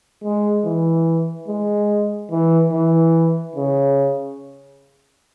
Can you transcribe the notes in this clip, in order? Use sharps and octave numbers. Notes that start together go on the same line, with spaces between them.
G#3
E3
G#3
E3
E3
C#3